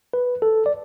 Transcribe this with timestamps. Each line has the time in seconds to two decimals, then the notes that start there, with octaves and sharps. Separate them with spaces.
0.14 B4
0.42 A4
0.66 D5